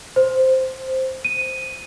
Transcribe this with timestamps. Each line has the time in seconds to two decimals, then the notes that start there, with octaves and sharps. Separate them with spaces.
0.16 C5
1.25 D#7